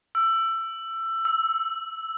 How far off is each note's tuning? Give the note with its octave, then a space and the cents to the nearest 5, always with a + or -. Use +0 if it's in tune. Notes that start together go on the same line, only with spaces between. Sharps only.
E6 +20
E6 -5